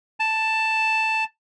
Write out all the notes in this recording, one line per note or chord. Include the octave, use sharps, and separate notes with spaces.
A5